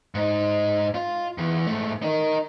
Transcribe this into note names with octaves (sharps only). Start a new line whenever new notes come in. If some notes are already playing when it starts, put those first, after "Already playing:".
G#2 D#4
F4
E2 E3
G#2 A3
D#4 A#4